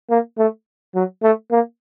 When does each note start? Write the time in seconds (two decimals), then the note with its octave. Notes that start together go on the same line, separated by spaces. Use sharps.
0.10 A#3
0.38 A3
0.95 F#3
1.23 A3
1.51 A#3